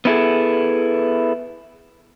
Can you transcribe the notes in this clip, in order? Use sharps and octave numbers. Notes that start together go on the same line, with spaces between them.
B3 C#4 E4 F4 G#4 A4